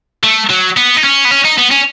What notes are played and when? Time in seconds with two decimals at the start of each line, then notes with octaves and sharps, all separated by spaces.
0.23 A3
0.50 F#3
0.77 B3
0.97 D#4
1.04 C#4
1.25 B3
1.31 C#4
1.45 D#4
1.58 B3
1.71 C#4